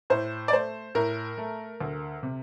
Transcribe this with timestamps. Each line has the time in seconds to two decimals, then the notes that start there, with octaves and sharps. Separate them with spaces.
0.10 A2 C5
0.48 D5
0.52 A3 C5
0.95 A2 A#4
1.38 A3
1.81 D2
2.23 C3